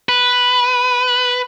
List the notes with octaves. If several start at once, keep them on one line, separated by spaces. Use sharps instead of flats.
B4